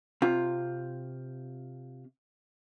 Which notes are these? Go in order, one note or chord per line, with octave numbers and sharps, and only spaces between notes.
C3 F4